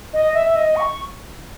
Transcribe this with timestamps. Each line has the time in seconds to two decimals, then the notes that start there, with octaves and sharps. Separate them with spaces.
0.13 D#5
0.34 E5
0.56 D#5
0.76 C#6